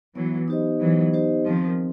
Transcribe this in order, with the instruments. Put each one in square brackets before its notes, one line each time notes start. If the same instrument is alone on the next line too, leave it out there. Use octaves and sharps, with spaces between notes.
[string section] E3 F#3 [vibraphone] B3
[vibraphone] D#4 G4 C5 D#5
[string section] E3 F#3 [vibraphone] B3
[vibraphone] D#4 G4 C5 D#5
[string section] D#3 F3 [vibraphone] C4